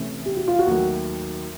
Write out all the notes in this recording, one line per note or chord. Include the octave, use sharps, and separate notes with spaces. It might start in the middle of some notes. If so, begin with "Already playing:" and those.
Already playing: C3 E3 A3 C#4
G4
F#4
F4
F#4
D#2 D#3 F#3 A3